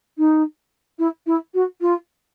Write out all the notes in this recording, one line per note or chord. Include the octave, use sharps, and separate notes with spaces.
D#4
E4
E4
F#4
F4